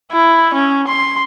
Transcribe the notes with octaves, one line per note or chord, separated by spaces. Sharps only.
E4
C#4
C6